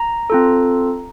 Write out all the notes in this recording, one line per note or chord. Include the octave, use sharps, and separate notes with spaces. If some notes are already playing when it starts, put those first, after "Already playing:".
Already playing: A#5
C4 F4 A4